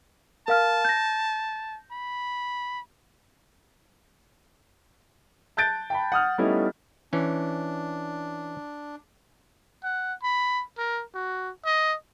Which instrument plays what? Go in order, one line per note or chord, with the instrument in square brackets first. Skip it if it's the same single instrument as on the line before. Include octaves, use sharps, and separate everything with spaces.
[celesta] A#4 F5 F6 [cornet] A5
[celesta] G6 A#6
[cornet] B5
[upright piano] A5 F#6 G6 A6 D7
G5 A5 B5
F#5 D#6 F6
G3 A3 B3 C#4 D#4 E4
[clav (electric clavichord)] E3 C#4 [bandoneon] D4
[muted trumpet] F#5
B5
A#4
F#4
D#5